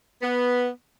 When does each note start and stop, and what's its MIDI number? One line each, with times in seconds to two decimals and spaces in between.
0.22 0.69 59